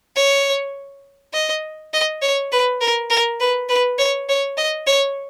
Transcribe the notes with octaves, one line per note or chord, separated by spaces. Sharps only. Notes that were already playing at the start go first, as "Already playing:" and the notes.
C#5
D#5
D#5
C#5
B4
A#4
A#4
B4
B4
C#5
C#5
D#5
C#5